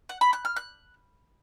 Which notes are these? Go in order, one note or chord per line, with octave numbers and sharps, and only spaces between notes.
F#5
B5
F#6
F6
F#6